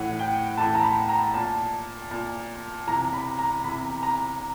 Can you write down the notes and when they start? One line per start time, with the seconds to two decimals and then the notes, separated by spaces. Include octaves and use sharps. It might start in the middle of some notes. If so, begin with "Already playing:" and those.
Already playing: A2 E3 F#5
0.19 G5
0.57 A2 E3 A5
0.75 A#5
0.83 B5
1.09 A#5
1.34 A#2 A5
2.11 A#2
2.87 C3 E3 A#5
3.13 B5
3.39 A#5
3.64 C3 E3 B5
4.03 A#5